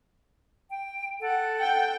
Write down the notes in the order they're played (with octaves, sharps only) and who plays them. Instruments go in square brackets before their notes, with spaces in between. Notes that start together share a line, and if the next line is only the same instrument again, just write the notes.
[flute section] G5
A4 F#5
[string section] G5